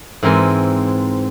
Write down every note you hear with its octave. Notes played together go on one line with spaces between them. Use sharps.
G#2 E3 C4 A#4 G#5